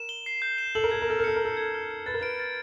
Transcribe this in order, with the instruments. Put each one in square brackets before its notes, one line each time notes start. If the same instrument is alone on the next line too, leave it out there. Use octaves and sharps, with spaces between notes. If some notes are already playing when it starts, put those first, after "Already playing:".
Already playing: [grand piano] A#4 [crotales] E7
[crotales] G7
C7
G6
E7
[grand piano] A4 [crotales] F#7
[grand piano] A#4
[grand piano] A4 [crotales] G#6
[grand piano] A#4
[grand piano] A4 [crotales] F6
[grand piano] A#4
[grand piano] A4 [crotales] C#7
[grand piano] A#4
[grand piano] A4 [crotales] F#7
[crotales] G#6
F6
C#7
[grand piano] B4 [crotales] A6
[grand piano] A#4
[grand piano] B4 [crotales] D7
[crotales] A6